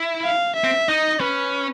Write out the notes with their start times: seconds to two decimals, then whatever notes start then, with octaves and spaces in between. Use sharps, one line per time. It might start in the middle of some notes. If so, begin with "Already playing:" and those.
Already playing: E4
0.25 F5
0.56 E5
0.64 C4
0.89 D#4 D#5
1.21 C#4 B4